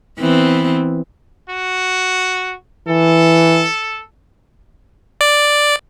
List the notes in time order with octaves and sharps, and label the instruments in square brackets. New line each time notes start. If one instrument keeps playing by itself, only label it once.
[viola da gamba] E3 B3 C4
[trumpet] F#4
[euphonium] E3 [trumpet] A4
[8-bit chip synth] D5